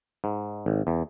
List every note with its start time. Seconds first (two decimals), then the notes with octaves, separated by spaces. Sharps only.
0.24 G#2
0.66 G#1
0.87 E2